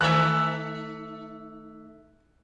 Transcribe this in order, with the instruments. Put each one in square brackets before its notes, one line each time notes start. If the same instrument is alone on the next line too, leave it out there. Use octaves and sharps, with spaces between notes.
[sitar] D#3 A3 E5 [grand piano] F#6